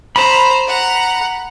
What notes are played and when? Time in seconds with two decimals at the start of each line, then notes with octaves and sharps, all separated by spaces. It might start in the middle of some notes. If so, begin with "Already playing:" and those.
0.16 C5 A#5 B5
0.67 F#5 A#5